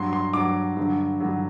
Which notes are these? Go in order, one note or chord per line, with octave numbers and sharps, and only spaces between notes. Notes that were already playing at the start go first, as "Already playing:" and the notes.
Already playing: G2 F#3 C6
C6
G2 F#3 D6
G2 D3 F#3
G2 D3 F#3